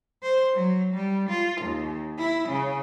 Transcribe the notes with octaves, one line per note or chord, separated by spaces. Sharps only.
C5
F#3
G3
F4
D#2
E4
C#3